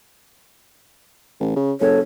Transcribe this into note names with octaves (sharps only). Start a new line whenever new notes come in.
A1
C#3
F#1 A4 C#5